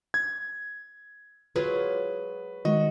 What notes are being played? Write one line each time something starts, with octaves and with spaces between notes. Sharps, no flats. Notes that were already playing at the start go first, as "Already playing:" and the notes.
G#6
F#3 G#3 F4 B4
D#3 G#3 F#4 D#5